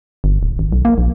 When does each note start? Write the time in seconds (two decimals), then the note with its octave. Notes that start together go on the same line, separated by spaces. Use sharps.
0.24 G1
0.43 D1
0.59 G#1
0.72 B1
0.85 A#3
0.98 A#1